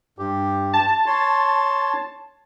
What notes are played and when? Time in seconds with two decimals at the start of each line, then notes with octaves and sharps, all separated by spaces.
0.19 G2 G4
0.73 A5
1.06 C#5 C6